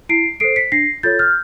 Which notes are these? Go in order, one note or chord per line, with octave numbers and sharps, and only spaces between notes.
E4 C7 D7
A4 C5 C7 D7
B6 C#7
D4 A#6 C7
F4 A4 C#5 G6 A6
F6 G6